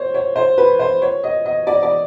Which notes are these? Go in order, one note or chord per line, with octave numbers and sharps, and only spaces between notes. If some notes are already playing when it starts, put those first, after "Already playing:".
Already playing: C5 C#5
C#5
C5
B4
C5
C#5
D#5
D#5
D5
D5